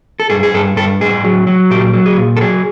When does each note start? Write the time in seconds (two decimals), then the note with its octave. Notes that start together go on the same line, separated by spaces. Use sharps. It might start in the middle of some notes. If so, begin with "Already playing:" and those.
0.20 A4
0.30 G2 G#4
0.43 G#4
0.54 G2 A4
0.76 G2 A4
1.01 A2 G#4
1.24 F#3
1.47 F#3
1.71 A#2 G4
1.93 F#3
2.06 G#4
2.18 A#2
2.37 A4
2.41 F#3 G#4